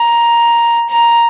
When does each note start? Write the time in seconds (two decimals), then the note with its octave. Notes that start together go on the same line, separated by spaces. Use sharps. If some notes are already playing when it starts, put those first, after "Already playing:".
Already playing: A#5
0.90 A#5